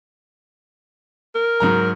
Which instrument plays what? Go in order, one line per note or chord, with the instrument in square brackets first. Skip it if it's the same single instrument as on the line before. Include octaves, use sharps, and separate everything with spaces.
[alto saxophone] A#4
[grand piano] G#2 F#3 A#5